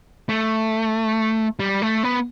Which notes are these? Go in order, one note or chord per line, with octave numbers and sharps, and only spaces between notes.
A3
G3
A3
B3